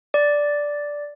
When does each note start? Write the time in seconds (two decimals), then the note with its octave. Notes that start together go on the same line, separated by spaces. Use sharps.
0.14 D5